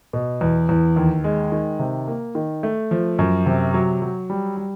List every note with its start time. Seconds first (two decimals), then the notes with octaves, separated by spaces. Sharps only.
0.13 B2
0.41 E2
0.69 E2
0.96 D#2
1.24 G#3
1.52 D#3
1.79 C3
2.08 A#3
2.35 D#3
2.63 A3
2.91 F3
3.19 F#2
3.46 C3
3.74 F#3
4.02 F#3
4.30 G3
4.57 G3